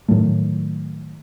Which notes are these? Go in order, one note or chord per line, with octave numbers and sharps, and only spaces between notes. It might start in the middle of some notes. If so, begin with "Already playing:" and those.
A2 D#3 F#3 A3